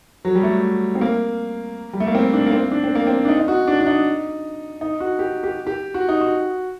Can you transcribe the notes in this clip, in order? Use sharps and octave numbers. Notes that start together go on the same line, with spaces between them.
F#3
G3
A3
C4
A#3
G3
A3
A#3
C4
D4
A#3
C4
D4
C4
A#3
C4
D4
D#4
D#4
F#4
D4
D4
D#4
D#4
F#4
G4
G4
G4
F#4
D#4
F#4